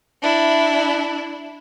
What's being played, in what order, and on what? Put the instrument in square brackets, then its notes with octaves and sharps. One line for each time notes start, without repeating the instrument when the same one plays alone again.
[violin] D4 E4